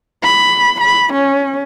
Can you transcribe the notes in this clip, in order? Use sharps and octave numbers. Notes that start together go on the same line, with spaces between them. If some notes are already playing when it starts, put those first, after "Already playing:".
B5
B5
C#4